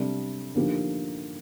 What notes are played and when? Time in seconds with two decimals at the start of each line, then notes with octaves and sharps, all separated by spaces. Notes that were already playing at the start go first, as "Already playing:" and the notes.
Already playing: C3 G3 D4 A4
0.55 D3 F3 A#3 D#4 G4